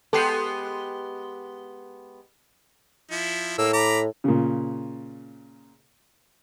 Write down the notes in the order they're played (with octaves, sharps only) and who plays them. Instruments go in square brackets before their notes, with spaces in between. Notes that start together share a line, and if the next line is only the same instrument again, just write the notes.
[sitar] G#3 B3 G4 [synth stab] A4 G5 C7
[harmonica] F3 E4
[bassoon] A2 [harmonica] A#3 E6
[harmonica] A#5 B5 D6
[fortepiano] A#2 C#3